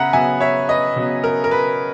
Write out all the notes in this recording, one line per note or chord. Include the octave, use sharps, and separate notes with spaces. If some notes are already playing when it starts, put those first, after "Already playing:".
Already playing: C#3 B3 E5 F#5 A#5
C#3 F#3 B3 E5 G#5
C#5 E5
B4 D#5
C#3 F#3 B3
A#4
A#4
B4